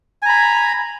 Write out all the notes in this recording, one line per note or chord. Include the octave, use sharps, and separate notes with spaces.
G#5 A#5 B5